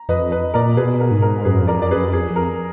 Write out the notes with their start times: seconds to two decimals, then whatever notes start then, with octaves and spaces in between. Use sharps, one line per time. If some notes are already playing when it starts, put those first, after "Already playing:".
Already playing: A#5
0.09 F2 B4 D#5
0.32 B4 D#5
0.54 A#2 A#4 D5
0.77 B2 G#4 B4
1.00 A#4
1.11 G#2
1.22 A#4
1.45 F#2 G#4 B4
1.62 F2
1.67 A#4 D5
1.79 F#2 D5
1.91 G#4 B4
1.96 F#2
2.13 F2 G#4
2.30 F2
2.36 A#4